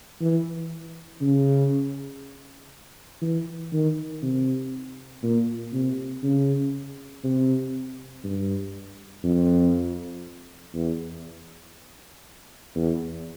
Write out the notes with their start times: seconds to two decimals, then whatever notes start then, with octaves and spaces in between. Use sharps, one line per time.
0.21 E3
1.21 C#3
3.22 E3
3.72 D#3
4.22 C3
5.23 A#2
5.73 C3
6.23 C#3
7.23 C3
8.24 G2
9.24 F2
10.74 E2
12.75 E2